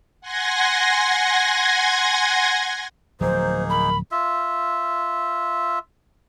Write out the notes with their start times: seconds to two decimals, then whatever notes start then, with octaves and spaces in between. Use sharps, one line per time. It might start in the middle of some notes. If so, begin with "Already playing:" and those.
0.21 F#5 G#5 C6 G#6 A#6
3.21 D1 F3 F#3 A#3 D#4 G#4 C5
3.70 A#4 B5
4.11 F4 E5